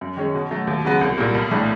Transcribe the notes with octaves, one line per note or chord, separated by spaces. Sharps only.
F#2
D#3 G#3 C#4
B2
F#3 A3
D#2
C#3 F#3 B3
C2
A#2 G3 A#3
B1
A2 E3 A3 D4